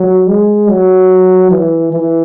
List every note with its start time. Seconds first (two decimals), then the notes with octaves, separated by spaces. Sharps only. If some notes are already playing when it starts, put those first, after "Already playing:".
Already playing: F#3
0.27 G#3
0.69 F#3
1.51 E3
1.92 E3